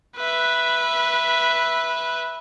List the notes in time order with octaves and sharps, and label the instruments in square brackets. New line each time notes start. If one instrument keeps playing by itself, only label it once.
[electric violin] B4 E5